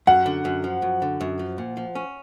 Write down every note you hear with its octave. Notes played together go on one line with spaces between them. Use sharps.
F#2 F#5
D3
F#2
F3
F#2
D3
F#2
F3
A#2
F3
C#4